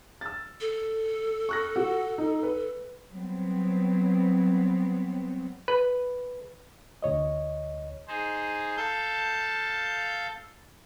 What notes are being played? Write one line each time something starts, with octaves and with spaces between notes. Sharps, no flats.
E6 A6
A4
C#6 F#6 A#6
F#4
D#4
B4
F#3 G3 B3 C4
B4
D2 C#5 D#5
D#4 G#4 C5
A4 F5 A5 G6